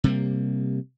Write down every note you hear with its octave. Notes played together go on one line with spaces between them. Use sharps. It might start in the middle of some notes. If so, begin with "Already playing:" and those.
C3 G3 A#3